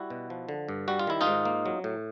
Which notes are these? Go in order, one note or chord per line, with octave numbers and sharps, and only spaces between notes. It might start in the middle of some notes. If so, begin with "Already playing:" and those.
Already playing: G3 E4 F#4
B2
F3
D3
G2
G3 F#4
F4
D#3 E4
D#4 F4
G#2
A#3
F#3
A2